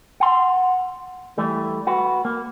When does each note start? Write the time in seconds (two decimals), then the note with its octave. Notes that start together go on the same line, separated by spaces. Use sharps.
0.20 F#5 C6
1.38 E3 G3 A3
1.87 F#4 B4
2.25 A#3